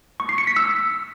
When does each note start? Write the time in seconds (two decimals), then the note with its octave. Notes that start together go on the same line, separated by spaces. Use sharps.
0.20 C#6
0.29 C7
0.38 C#7
0.47 B6
0.56 E6